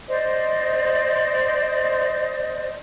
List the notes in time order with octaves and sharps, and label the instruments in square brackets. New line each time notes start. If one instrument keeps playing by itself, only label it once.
[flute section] C5 D5 D#5